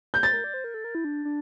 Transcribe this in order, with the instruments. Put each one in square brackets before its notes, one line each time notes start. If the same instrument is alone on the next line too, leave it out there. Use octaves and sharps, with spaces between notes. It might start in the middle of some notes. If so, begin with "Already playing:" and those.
[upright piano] G6
[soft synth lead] C5 [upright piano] A6
[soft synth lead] A#4
D5
C5
A#4
A4
A#4
E4
D4
D4